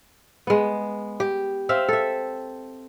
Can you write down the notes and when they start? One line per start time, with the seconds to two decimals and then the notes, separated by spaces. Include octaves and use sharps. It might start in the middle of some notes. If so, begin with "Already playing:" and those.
0.47 G#3 B3
1.20 G4
1.69 C4 E5 F5
1.88 A4 E5